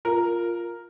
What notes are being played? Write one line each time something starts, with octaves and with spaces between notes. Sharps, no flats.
F4 A#4